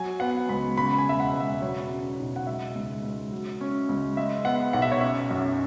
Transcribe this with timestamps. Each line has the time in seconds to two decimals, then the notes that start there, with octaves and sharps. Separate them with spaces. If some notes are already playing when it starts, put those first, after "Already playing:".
Already playing: F#3 G#5
0.20 B3 F#5
0.49 C#2 B5
0.77 C#3 B5
0.98 G#5
1.06 E1 E5
1.20 F#5
1.33 E1
1.40 E5
1.61 F#3 C#5
1.90 C#4
2.19 B1
2.36 F#5
2.47 G#3 E5
2.75 C#2
3.03 C#2
3.32 F#3
3.61 C#4
3.89 C#2
4.17 G#3 E5
4.45 B3 F#5
4.73 B1 F#5
4.82 E5
4.92 C#5
5.01 C#4 E5
5.31 F#2